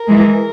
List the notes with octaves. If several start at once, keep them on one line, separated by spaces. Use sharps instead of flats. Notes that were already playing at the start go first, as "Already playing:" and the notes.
Already playing: A#4
E3 G#3